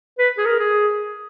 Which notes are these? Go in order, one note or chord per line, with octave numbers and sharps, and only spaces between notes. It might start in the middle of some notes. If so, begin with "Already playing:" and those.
B4
G#4
A#4
G#4